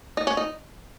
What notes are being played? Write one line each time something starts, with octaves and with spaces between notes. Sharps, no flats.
D#4
C#4
D#4